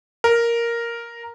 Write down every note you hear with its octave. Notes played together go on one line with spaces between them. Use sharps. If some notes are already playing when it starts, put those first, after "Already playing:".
A#4